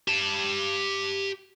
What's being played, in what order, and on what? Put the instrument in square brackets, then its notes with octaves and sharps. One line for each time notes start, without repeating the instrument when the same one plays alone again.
[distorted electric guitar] G4 A5